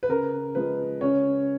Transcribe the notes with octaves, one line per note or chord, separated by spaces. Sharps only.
B4
C#3 A#4
F3 G#3 B4
C#3 C#4 C#5